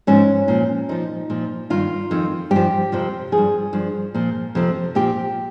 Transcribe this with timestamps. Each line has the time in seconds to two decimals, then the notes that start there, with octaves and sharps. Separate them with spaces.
0.07 G#2 F3 C#4
0.48 A#2 F3
0.89 A#2 F3 D#4
1.30 A#2 F3
1.70 G2 D#3 F4
2.11 F2 D#3
2.51 G2 G4
2.56 F3
2.92 F2 C3 F3
3.32 F3 G#4
3.38 G2
3.73 G2 F3
4.14 A#2 F3
4.55 F2 C3 F3
4.95 A#2 F3 G4